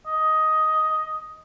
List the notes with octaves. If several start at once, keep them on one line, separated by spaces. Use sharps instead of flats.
D#5